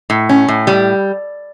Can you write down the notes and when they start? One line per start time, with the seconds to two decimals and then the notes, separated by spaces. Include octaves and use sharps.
0.10 A2
0.29 C#4
0.48 A2
0.67 G3